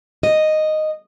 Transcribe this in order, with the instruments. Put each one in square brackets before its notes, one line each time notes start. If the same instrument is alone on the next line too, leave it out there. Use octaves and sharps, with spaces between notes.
[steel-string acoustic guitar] D#5